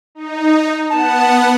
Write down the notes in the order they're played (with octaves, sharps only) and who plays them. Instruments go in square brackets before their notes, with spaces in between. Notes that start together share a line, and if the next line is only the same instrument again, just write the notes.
[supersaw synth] D#4
[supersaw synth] B3 F#5 [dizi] A5